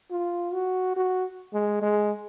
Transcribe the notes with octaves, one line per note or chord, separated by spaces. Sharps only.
F4
F#4
F#4
G#3
G#3